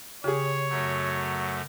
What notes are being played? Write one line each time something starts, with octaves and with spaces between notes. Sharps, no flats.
C#3 G4 G#4 C#5
F#2 F#3 A3